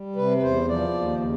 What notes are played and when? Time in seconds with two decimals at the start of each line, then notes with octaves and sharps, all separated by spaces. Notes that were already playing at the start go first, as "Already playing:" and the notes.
Already playing: G3
0.16 C3 B4
0.37 B4
0.42 E2 C5
0.68 F3 D5
0.94 D#2
1.20 C#3